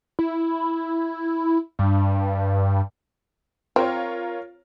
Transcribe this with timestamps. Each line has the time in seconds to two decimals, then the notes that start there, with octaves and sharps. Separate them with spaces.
0.19 E4
1.79 G2
3.76 C4 F4 A#4 C#5